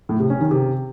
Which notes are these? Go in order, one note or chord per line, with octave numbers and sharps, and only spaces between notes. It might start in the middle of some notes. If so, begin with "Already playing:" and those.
A2
C3
C#4
D#3
C3